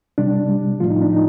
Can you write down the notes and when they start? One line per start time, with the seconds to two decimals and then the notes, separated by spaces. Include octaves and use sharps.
0.18 C3 G3 D4
0.49 C3 G3
0.80 A2 F3 A3 F4
0.90 D#4
1.02 D4
1.11 A2 F3 D#4